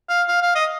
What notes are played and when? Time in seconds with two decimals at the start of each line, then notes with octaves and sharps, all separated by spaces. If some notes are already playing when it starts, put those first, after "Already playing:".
0.09 F5
0.28 F5
0.42 F5
0.55 D#5